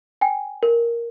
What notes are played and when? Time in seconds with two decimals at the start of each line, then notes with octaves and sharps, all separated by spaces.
0.21 G5 G#5
0.63 A#4